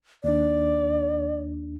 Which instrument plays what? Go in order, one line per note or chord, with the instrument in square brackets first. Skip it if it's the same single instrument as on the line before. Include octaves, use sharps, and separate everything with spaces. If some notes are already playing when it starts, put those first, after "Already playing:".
[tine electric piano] D#2 D4 [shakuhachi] D5